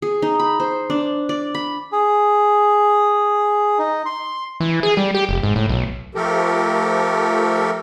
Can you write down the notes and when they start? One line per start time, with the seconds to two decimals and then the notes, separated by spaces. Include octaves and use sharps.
0.02 G#4
0.22 D#4
0.39 B5
0.60 C5
0.90 D4
1.29 D5
1.55 B5
1.92 G#4
3.78 D#4
4.06 C6
4.60 E3
4.83 G#4
4.97 G3
5.15 G4
5.29 F1
5.43 G#2
5.56 A2
5.69 B1
6.15 F3 A3 G4 A4 A#4